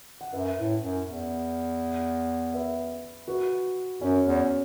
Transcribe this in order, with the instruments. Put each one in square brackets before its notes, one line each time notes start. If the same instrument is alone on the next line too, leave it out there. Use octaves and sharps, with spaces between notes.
[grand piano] F#5
[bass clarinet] F#2 [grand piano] B4 E5
[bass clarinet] A2
F#2
E2
[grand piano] B4 E5
F#4 B4
[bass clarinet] F#2 [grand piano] C#4 F#4
[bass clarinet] E2